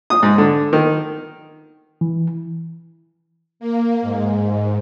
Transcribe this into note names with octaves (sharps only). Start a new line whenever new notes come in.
D#6
G#2
D3
D#3
E3
A#3
G#2